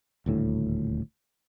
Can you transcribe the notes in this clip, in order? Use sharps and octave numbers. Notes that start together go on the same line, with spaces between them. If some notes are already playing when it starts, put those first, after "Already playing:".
D#1 D2 A2